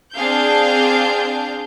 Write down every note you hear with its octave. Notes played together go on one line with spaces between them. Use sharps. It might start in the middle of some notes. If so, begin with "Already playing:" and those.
C4 D4 G#4 F5 G6